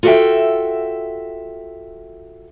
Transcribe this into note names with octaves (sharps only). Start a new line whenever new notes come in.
F4 F#4 A4 D5 E5 G5